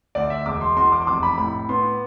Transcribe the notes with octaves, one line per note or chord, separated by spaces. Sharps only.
D2 D5
E5
E1 D6
C6
E2 C6
D6
C6
F1 D6
B5
A2 B5
B3 C6